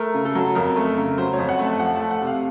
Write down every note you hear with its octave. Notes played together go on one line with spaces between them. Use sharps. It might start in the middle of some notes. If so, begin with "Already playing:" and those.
Already playing: A3 A#4
C#3
A4
F#3
F2 A#4
A3
C#3
F#3 C5
C#5
F2
F#5
A3
A5
F3 F#5
A3 A5
F#5
C3
F5